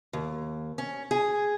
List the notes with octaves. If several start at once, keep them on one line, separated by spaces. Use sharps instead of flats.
D#2
C#4
G#4